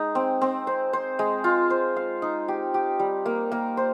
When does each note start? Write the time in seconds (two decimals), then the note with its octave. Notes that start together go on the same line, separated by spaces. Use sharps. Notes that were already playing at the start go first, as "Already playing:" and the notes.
Already playing: G#3 D#4
0.15 C4
0.42 C4
0.67 C5
0.93 C5
1.19 G#3
1.44 F4
1.70 C5
1.96 F5
2.22 D#4
2.48 G4
2.74 G4
2.99 G3
3.26 A#3
3.52 A#3
3.77 C5